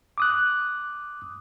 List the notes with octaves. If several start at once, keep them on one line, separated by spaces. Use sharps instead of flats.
D6 D#6 F#6